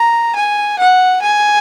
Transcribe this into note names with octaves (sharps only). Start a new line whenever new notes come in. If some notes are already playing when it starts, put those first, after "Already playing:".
Already playing: A#5
G#5
F#5
G#5